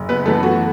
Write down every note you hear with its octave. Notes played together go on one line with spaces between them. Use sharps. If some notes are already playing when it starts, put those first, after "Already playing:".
Already playing: F#1
B3 B4
F#2 E3 A3 B3 A4
F#4